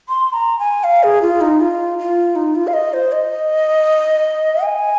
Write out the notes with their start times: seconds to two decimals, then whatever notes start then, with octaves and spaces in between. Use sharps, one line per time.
0.08 C6
0.33 A#5
0.59 G#5
0.84 F5
1.03 G#4
1.22 F4
1.41 D#4
1.60 F4
1.98 F4
2.35 D#4
2.55 F4
2.67 F5
2.73 D#5
2.94 C5
3.12 D#5
4.64 G#5